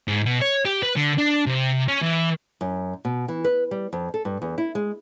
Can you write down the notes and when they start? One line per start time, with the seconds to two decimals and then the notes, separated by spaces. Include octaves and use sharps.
0.08 G#2
0.25 B2
0.41 C#5
0.65 G4
0.83 B4
0.96 D3
1.18 D4
1.46 C3
1.88 C#4
2.02 E3
2.61 F#2
3.05 B2
3.28 E3
3.44 B4
3.71 G3
3.93 F2
4.14 A4
4.25 G2
4.42 E2
4.58 E4
4.75 G#3